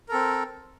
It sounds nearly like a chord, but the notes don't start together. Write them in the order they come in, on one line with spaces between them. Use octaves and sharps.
A#4 A4 C4